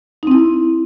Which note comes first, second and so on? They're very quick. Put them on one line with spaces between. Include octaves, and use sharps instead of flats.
D#4 C4 E4